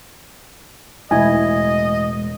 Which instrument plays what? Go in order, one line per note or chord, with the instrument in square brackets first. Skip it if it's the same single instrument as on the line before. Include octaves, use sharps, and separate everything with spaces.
[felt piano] E1 A2 [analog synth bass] G#3 [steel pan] E4 G#5 [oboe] D#5